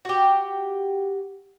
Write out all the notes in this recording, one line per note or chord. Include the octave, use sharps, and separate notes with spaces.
F#4 G4